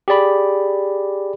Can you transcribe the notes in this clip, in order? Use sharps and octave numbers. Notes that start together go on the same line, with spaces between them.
G4 G#4 D5 B5